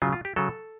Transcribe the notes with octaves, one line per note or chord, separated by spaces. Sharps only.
C#3 F#3 F4
F4
G4
C#3 F#3 A4